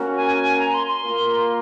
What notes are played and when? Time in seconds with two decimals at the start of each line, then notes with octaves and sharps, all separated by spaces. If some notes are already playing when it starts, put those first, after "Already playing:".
Already playing: A#3 C#4 F#4 A#4
0.16 G#5
0.59 A#5
0.74 C6
0.88 C6
1.03 A#3 F4 A#4